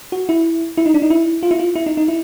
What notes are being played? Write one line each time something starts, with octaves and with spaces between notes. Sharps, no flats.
F#4
E4
E4
D#4
D4
D#4
E4
F4
E4
F4
E4
D#4
D#4
E4